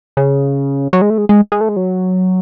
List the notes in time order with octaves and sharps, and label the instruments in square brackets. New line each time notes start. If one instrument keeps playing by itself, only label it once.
[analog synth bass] C#3
F#3
G#3
A3
G#3
G#3
G#3
A3
G#3
F#3